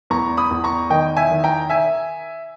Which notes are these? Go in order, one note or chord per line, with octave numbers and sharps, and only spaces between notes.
E2 A#5 C#6
B5 D#6
E2
A#5 C#6
D#3 D#5 G5
E5 G#5
D#3
G5 A#5
E5 G#5